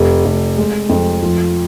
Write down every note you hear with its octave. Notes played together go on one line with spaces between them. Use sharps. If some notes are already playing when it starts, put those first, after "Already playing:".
Already playing: F1
F1
G#3
F2
F3